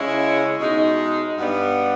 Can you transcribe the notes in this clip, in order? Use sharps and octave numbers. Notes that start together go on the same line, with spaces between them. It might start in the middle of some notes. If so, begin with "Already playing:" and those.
Already playing: C#3 G#3 C#4 E4
B2 G#3 D#4
G2 G3 B3